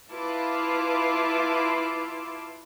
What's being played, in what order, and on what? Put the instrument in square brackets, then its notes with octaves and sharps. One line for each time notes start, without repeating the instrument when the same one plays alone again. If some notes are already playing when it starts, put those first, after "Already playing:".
[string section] E4 F4 B4 A5 C6 D6